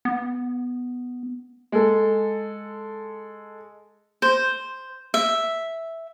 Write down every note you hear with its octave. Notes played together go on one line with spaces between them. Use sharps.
B3
G#3 A4
C5
E5